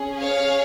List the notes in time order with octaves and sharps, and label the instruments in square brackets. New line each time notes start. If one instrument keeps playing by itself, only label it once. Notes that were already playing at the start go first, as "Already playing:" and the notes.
Already playing: [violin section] C#4 G#4
C#5 F5